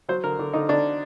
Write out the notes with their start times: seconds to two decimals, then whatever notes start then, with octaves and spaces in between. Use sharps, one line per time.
0.09 F#3 C5
0.24 D3 A#4
0.39 D3
0.53 D3 D#4
0.69 D3 D4